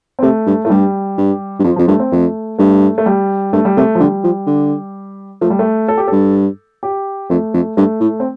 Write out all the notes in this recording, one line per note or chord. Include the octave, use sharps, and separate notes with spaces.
C4
C3 A3
G2
A2 A3
G2 G3
G2
G2
F2 F3
F2 F3
G2 A3
C4
F2 A3
G2 A3
A3
G3
G2 A3
G3
C3 A3
F3
D3 G3
F3
D3
F3 A3
G3
A3
A4
G4
G2 A4
G4
F2 A3
F2
G2 A3
A2
C4